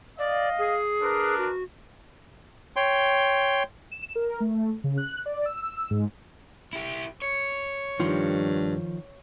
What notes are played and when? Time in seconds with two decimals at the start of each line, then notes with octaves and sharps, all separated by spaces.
0.19 D5 D#5 F5
0.59 G#4
1.02 D4 A#4 B4
1.38 F#4
2.76 C#5 G5 C6
3.91 E7
4.15 A#4
4.40 A3
4.84 C#3
4.98 F#6
5.26 D5
5.45 E6
5.90 G#2
6.73 E4 G4
7.22 C#5
8.00 G2 D#3 F3